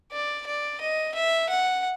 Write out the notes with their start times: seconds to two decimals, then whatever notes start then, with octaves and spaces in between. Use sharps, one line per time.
0.12 D5
0.47 D5
0.81 D#5
1.15 E5
1.49 F#5